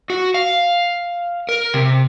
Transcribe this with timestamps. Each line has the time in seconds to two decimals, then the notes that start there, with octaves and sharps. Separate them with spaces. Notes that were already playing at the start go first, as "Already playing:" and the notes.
0.10 F#4
0.34 F5
1.49 A#4
1.74 C3